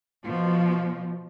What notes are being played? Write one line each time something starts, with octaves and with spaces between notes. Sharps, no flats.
B2 F3